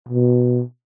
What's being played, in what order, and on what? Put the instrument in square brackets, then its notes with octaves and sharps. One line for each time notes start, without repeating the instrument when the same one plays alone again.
[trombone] B2